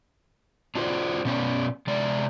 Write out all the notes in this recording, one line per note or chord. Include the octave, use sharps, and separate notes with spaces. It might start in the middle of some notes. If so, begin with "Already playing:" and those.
D4 F4 F#4 A#4 C5 D5
B2 B3 C#4 D5
C3 G#3 D5